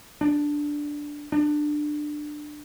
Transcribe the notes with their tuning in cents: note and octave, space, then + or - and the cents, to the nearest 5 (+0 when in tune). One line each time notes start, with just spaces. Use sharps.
D4 +0
D4 +20